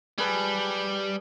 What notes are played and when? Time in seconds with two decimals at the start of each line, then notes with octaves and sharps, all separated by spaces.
0.18 G3 G#4 B4 A5